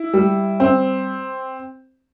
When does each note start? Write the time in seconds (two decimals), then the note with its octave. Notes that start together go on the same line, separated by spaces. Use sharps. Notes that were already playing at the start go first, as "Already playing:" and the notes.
Already playing: E4
0.13 G3
0.60 C4